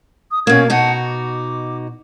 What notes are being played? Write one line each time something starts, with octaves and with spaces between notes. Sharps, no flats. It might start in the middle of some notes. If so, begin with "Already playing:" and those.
D#6
B2 A#3 C#4 G#6
B2 D#4 F#4 F#5 A5
D6